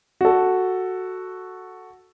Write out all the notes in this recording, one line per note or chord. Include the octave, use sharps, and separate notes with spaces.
F#4 A4